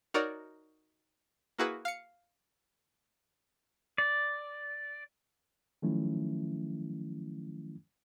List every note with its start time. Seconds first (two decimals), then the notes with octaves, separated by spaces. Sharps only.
0.14 D#4 F#4 A#4 C#5 D5
1.58 A#3 E4 F#4 G#4 B4
1.85 F5 C#7
3.98 D5
5.82 D#3 F3 F#3 A3 C#4 E4